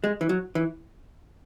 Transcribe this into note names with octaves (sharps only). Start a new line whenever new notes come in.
G#3
E3
F#3
E3